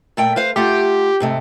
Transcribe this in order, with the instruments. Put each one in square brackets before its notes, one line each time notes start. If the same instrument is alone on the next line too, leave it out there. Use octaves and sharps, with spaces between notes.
[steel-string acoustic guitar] A#2 A3 G5
B4 C5 F5
[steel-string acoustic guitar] A3 F4 F#5 [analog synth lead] G4
[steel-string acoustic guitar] G#2 C3 A3